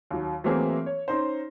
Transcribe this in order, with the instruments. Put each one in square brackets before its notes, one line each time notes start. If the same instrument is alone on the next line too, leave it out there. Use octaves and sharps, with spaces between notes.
[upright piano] D#2 F#3
E3 F#3 A3 A#3 C4 G#4
C#5
C#4 D#4 C5